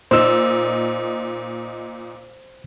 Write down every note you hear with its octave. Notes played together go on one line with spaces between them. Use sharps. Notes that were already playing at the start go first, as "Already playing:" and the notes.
A#2 D#4 C5 E6